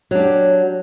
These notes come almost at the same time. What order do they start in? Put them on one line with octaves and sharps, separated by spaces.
F#3 D4 G4